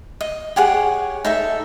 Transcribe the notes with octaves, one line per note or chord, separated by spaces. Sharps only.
D#5
G4 G#4 C#5 F#5
D#4 A4 E5